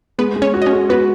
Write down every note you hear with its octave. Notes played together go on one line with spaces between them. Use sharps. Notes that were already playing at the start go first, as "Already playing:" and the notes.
G#3 B3 B4
G#3
C#4 C#5
F#4
D#5
C#4 C#5
G#3
B3 F#4 B4